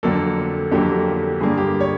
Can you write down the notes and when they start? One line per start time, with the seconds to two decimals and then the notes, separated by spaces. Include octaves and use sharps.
0.03 F2 D3 F#3 A#3 A4
0.72 F2 D3 F#3 A#3 G4
1.40 G2 D3 G3 A#3 G#4
1.58 G4
1.80 C#5